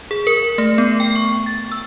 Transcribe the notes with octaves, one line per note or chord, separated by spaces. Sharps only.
G#4
A#4
A3
B3
G5
C#6
A6
E6